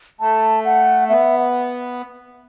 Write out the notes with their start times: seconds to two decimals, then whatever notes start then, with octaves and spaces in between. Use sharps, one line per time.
0.20 A3 A5
0.65 F#5
1.09 B3 E5